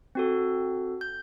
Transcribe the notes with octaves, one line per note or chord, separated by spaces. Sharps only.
C4 F#4 A4
G6